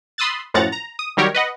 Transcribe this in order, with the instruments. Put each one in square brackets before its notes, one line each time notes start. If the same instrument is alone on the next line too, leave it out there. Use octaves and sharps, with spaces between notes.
[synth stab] B5 C6 D#6 E6 F#6 A6
F#2 A2 F3 F#5 A#5 A6
A#5
D#6
D#3 F#3 G3 G4 A#4 C#5
B4 D#5 F#5